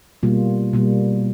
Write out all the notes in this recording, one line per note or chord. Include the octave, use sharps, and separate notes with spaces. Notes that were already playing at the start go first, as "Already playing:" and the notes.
B2 G3 A#3 F4
B2 G3 A#3